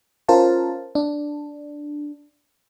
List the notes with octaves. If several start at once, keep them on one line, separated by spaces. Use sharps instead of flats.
C#4 F4 A#4 C5 F5 A5
D4